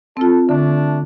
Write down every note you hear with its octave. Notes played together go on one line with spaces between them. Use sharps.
C4 F4 A4
D3 A3 D4